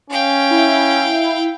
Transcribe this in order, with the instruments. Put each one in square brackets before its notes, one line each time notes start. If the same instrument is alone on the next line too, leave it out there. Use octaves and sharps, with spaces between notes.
[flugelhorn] C#4 [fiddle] F5 G5
[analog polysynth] E4